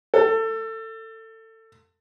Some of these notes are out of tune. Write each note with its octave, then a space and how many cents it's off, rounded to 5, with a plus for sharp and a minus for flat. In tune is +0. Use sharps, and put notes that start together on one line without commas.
A4 +25